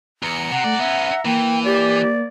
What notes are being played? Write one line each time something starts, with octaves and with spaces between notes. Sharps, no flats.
E2 A#5 C#7
C3 F#5
C2 A3 D5
B3 C#4 E5
E3 A#3 G5
G4 D5